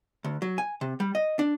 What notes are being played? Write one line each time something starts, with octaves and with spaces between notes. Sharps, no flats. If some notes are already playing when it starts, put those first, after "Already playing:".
D2
F#3
G#5
C3
G3
D#5
D4